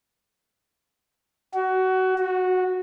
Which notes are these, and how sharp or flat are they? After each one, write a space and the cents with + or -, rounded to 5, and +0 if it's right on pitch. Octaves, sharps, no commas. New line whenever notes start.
F#4 +20
F#4 -10